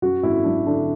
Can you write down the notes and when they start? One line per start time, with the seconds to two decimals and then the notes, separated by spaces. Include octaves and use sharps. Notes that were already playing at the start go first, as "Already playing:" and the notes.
0.02 F#2 F#4
0.23 G#1 E4
0.44 F#3 D4
0.66 D3 D4